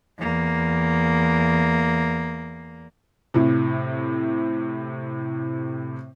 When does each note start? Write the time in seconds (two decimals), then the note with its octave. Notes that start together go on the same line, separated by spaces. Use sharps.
0.19 E2 A#3
3.34 A2 C3